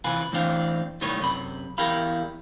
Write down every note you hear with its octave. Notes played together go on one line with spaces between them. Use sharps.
C3 E3 F4 B4 G#5
A2 E3 C4 D4 F5
B1 A2 D#3 G3 B4 C#5
F#2 C3 B5
E2 E4 G4 A#4 F5 B5